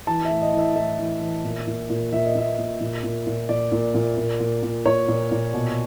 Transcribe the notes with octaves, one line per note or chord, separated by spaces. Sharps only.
E3 A5
E5
A2
D#5
E3
E5
A2 E5
E3
E3
A#2
A#2
A#2
A#2 E5
D#5
A#2 E5
A#2
A#2
A#2
A#2
A#2 D5
A#2
A#2
A#2
A#2
A#2
A#2 C#5
A#2
A#2
B2